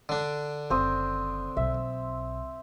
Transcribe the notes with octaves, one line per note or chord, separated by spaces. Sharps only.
D3 D4
F#1 C4 D#6
B1 E5